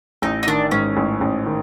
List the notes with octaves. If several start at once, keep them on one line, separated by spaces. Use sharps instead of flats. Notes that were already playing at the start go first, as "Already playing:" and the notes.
A1 D#4
D#4
D#3 D4
G#2 C#4
A1
A1
D#3